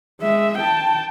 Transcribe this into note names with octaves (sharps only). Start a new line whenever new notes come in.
G#3 E5
G5 A5